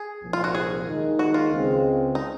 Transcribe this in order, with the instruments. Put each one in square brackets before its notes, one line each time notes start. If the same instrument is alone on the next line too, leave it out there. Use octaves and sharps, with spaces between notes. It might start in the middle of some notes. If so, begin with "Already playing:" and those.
Already playing: [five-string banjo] G#4
[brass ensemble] C2 A#2 F3
[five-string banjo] F4
F#4
G#4
[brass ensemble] D#2 D#3 G#3 D#4
[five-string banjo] F#4
F4
[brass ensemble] C#2 C#3 G#3 C4
[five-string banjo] D#4